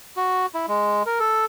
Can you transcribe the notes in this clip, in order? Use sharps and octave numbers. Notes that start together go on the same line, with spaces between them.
F#4
E4
G#3
A#4
A4